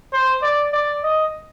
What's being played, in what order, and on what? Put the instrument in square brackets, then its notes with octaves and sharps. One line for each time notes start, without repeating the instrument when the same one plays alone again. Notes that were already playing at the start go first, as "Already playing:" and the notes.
[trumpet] C5
D5
D5
D#5